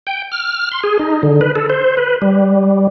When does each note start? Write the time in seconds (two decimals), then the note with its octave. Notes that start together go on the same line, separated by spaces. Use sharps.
0.07 G5
0.32 F6
0.72 C6
0.84 G#4
0.99 D#4
1.23 D3
1.41 B4
1.55 A4
1.70 C5
1.97 B4
2.22 G3